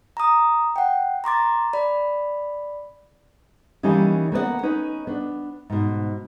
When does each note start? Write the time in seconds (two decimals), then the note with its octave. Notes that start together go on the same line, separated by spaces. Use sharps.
0.17 A#5 D#6
0.76 F#5 G5
1.24 A#5 C6 D6 A6
1.73 D5 B5
3.83 D#3 E3 G3 A#3 C#4 D#4
4.32 A#3 B3 D5 F#5
4.63 C#4 D#4 B4
5.07 B3 D4
5.70 G#2 B2